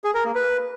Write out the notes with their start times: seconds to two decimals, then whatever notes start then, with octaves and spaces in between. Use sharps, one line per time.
0.04 G#4
0.14 A#4
0.25 A#3
0.35 B4